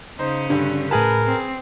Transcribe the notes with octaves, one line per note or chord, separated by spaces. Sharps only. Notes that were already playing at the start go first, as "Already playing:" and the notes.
C#3 C#4 D#4 C5
G2 D3 D4
A2 G#4 A#4 B4 A5 B5
C4